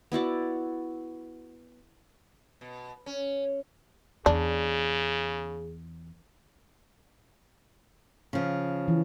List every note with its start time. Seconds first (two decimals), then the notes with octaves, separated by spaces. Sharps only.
0.12 B3 E4 F#4 D5
2.61 B2
3.06 C#4
4.26 E2 C#3 D4 G#4
8.33 C#3 F3
8.88 E3